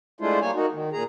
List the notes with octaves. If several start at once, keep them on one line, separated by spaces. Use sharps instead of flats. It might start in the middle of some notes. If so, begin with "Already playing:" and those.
G#3 A3 D4 E4 F4 C5
G3 A#3 C#5 G#5
A#3 D#4 F#4
D#3
A#2 G#4 A#5